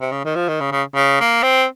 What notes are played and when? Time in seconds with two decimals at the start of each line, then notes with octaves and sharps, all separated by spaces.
0.01 C3
0.12 C#3
0.25 D#3
0.36 F3
0.48 D#3
0.61 C#3
0.72 C#3
0.96 C#3
1.20 A#3
1.43 C4